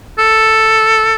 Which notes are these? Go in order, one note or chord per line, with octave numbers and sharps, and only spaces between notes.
A4